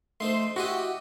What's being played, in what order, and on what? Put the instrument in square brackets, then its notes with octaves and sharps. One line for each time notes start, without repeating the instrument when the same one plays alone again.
[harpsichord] A3 D#4 C5 [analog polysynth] C6
[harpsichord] E4 G4 D#5 [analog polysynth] F#4